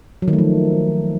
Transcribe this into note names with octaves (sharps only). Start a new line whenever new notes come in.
F#3
D#3
A3
F3